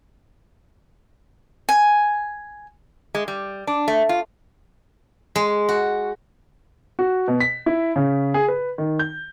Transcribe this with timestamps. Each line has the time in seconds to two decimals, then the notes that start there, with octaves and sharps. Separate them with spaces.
1.69 G#5
3.15 G#3
3.28 G3
3.67 D4
3.88 A3
4.09 F4
5.36 G#3
5.69 F#4
6.99 F#4
7.28 B2
7.40 B6
7.66 E4
7.96 C#3
8.34 G#4
8.48 B4
8.78 D#3
8.99 G6